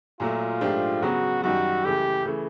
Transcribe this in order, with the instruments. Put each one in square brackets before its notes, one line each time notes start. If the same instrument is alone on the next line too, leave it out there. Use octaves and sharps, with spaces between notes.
[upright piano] A#2 F#3 A3 [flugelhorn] F4
[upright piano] G#2 F3 A3 D4 G4
[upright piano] C#3 F#3 B3 [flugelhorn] F#4
[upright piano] F#2 D#3 G3 [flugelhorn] F#4
[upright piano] C#2 C#3 E3 A3 [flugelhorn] G4
[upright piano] C#3 E3 A3